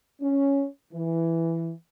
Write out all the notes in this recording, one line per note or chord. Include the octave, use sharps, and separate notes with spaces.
C#4
E3